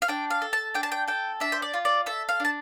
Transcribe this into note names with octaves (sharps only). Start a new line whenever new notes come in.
F5
D4 G5
F5
A4
A5
D4 G5
A5
G5
A4 G5
D4 E5
C5
D5
F4
D5
A4 E5
F5
D4 A5